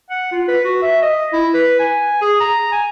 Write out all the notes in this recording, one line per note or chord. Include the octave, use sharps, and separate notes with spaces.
F#5
F4
B4
F#4
E5
D#5
E4
B4
G#5
G#4
A#5
G#5